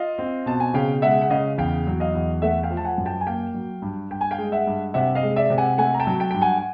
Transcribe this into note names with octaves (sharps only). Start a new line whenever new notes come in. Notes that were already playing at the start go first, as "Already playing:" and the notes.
Already playing: F4 D#5 F5
C4
B2 A5
G#5
C#3 F5 G5
G#3 E5 F#5
F#5
C#3 D#5 F5
E2 F5 G5
F#3
D#5 F5
E2
A3 E5 F#5
F5 G5
F3
A5
F#5 G#5
F#2
G5 A5
G#5
A#3 F5 G5
F#3
G2
G2 G5
G#5
F5 G5
G#3
E5 F#5
G2
C3 E5 F#5
D#5 F5
G#3
D5 E5
C3
F#5 G#5
A3 F#5 G#5
A#5
G5 A5
F#3
G5 A5
G2 G5
F#5 G#5
F#5